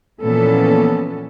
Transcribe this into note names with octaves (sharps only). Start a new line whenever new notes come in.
A#2 E3 F3 B3 C#4 A4